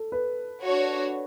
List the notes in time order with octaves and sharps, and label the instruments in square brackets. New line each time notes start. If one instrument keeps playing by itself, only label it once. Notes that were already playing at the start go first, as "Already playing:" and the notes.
Already playing: [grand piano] A4
B4
[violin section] D4 F#4 C#5